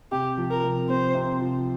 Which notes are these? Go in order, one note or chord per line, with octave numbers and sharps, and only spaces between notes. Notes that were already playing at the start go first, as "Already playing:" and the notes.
C3 G4
F3
A#4
C3
C4 C5
C3
F3